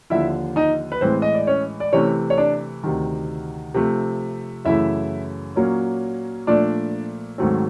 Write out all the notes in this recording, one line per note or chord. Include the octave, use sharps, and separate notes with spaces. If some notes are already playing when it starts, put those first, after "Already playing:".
D#2 D3 F3 E4 E5
D#4 D#5
B4
A2 E3 G#3 C4 C5
D#5
D5
C#4 C#5
D5
C3 E3 A3 C#4 C#5
C#5
D4 D5
D2 C3 D#3
C3 F3 A3
F#2 C#3 E3 A3 E4 E5
A#2 F#3 A#3 C#4
A#2 F3 A3 D4 D5
G#2 D#3 F#3 A3 C4